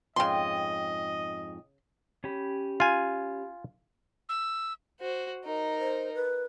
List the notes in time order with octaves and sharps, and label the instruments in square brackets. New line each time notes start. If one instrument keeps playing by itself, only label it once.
[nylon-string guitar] F2 G#2 G5 [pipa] C#3 C6 [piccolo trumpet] D#5
[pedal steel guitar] C#4 G4 B5
[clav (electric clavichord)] F4 G#5
[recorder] E6
[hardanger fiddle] F#4 C5
D#4 A#4
[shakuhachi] C5
B4